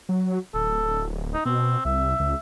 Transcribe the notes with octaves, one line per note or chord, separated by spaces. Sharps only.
F#3
D1 A4
D#4
B2 C4
C2 E5
C#2